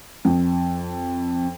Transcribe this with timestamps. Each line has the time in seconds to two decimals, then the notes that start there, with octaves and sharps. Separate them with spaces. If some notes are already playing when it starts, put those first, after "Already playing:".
0.25 F2